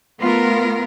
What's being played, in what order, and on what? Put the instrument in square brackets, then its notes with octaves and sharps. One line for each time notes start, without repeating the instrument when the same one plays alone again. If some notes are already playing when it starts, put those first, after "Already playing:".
[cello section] A3 B3 F4 A#4